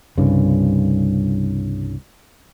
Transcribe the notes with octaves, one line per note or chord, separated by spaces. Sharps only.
C2 G2 C#3